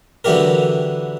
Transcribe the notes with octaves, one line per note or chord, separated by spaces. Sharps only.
D3 E3 F#3 G4 A#4